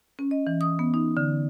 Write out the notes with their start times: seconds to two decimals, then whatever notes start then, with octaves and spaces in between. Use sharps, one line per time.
0.19 C#4
0.31 D#5
0.47 E3
0.61 D#6
0.79 B3
0.94 D#4
1.17 D3